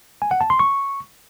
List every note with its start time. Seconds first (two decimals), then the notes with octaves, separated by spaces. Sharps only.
0.22 G#5
0.31 F#5
0.41 A5
0.50 C6
0.59 C#6